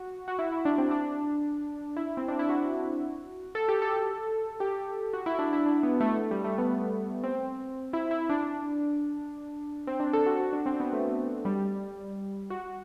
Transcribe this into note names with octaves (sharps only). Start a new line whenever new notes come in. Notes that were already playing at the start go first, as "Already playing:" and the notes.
Already playing: F#4
F#4
E4
E4
D4
C4
D4
E4
C4
D4
E4
F#4
A4
G4
A4
G4
F#4
E4
D4
E4
D4
B3
A3
A3
G3
A3
B3
C4
E4
E4
D4
C4
D4
A4
F#4
F#4
D4
C4
B3
A3
G3
F#4